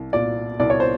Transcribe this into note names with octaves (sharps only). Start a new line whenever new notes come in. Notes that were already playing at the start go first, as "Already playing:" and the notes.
Already playing: C2
A#2 D5
C2 D5
C#5
C5